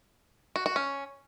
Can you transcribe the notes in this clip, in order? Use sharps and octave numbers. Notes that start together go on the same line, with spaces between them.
F#4
F#4
C#4